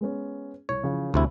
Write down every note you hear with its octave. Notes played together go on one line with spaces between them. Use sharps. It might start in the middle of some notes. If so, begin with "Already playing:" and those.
G#3 B3 C#4
C2 C#5
C#3 E3 F3
D2 C3 E4